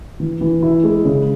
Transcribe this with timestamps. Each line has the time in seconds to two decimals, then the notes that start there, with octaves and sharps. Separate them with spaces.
0.20 E3
0.41 E3
0.62 E4
0.84 G#3
1.05 C#3